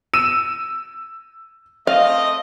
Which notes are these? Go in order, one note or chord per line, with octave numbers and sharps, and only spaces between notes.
E6 D#7 E7
A3 C4 D#5 F5